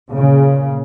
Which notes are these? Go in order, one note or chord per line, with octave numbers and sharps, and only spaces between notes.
A#2 C#3